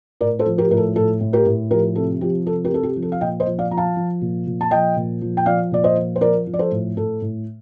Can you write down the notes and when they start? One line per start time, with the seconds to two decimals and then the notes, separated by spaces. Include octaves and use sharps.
0.21 A2 A#4 D5
0.39 A4 C5
0.46 F3
0.58 G4 A#4
0.70 A2 A#4
0.77 A4
0.96 A2 A4
1.20 A2
1.33 G4 A#4
1.46 A2
1.71 F3 G4 A#4
1.95 C3 A4
2.21 F3 G4
2.46 C3 A4
2.65 G4 A#4
2.70 C3 A4
2.83 G4
2.96 F3
3.02 A4
3.12 F5
3.21 A#2 D#5 G5
3.40 C5 D#5
3.46 F3
3.59 D5 F5
3.71 F3 A#5
3.77 F5 A5
3.96 F3
4.21 A#2
4.46 A#2
4.61 A5
4.71 F3 D#5 G5
4.96 A#2
5.21 F3
5.37 G5
5.46 F3 D5 F5
5.71 A#2 D5
5.84 C5 D#5
5.96 F3
6.16 C5
6.21 F3 A#4 D5
6.47 F3
6.53 D5
6.59 A4 C5
6.71 A2
6.96 A2 A4
7.21 A2